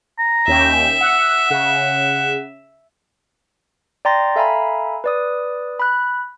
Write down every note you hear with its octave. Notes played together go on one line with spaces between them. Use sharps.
A#5
D#2 C#4 E5 G5
F#5 E6
C#3 F#5
D5 G5 A#5 C6 A6 A#6
A4 E5 F5 G#5 A#5 B5
B4 D5 D#6
B5 F#6